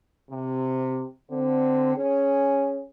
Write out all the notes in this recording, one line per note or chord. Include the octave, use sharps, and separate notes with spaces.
C3
D3 C4
C#4 G#4